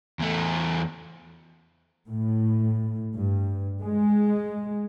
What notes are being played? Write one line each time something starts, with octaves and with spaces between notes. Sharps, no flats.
E2 A3
A2
G2
G#3